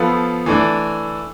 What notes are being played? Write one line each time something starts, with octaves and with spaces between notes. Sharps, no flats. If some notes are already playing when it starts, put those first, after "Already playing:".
Already playing: F3 B3 F4 A4
E3 A3 D4